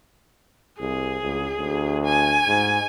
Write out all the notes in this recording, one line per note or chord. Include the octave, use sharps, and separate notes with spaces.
C2 G#4
C#2
D2
G#5
G#2